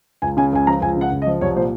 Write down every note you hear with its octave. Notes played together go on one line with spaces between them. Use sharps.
C#2 G#5
C#3 G#5
C#2 G#5
F3 A#5
C#2 G#5
C#3 F#5
C#2
D#5
F3
C2 C#5
A#2 C5